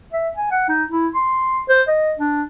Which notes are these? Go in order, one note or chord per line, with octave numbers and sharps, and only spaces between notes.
E5
G#5
F#5
D#4
E4
C6
C5
D#5
D4